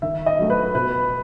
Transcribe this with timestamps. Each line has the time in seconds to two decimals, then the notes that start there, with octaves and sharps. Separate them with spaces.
0.02 D#3 E5
0.26 D#5
0.39 F#3 A3
0.50 B4
0.75 B2 B4